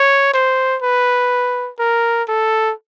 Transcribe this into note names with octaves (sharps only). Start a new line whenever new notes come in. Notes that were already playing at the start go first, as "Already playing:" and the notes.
Already playing: C#5
C5
B4
A#4
A4